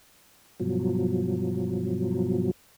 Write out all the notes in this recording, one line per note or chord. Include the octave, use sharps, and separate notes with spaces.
G2 B2 F3 F#3